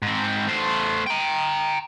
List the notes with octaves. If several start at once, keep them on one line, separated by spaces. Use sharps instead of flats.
G#2 C4
A3 C5
G5 A#5